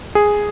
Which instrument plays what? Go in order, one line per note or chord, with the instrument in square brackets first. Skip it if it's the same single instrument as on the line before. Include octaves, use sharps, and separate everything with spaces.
[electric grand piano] G#4